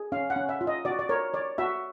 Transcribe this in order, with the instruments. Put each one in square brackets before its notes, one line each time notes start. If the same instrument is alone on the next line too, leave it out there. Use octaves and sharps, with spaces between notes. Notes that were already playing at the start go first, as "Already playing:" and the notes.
Already playing: [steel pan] G#4
C#4 F5
F#5
C#4
E5
F4
D#5
F#4 D5
D5
A#4 C#5
C#5 D5
F#4 E5